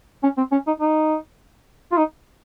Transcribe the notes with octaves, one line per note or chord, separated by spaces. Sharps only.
C#4
C4
C#4
D#4
D#4
F4
D#4